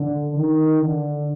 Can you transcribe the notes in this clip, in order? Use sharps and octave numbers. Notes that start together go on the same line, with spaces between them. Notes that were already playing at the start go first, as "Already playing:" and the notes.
Already playing: D3
D#3
D3